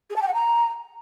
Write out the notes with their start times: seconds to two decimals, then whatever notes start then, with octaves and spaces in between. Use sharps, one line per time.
0.10 G#4
0.16 A5
0.22 G5
0.28 F#5
0.34 A#5